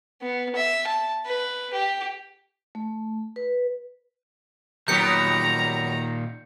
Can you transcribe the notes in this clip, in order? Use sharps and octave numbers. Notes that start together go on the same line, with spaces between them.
B3
E5
A5
B4
G4
A3
B4
A#2 D#3 F#3 B3 G4 A#5 G6 C#7